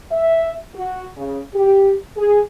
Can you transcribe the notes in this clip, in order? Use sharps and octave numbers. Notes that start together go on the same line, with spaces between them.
E5
F#4
C#3
G4
G#4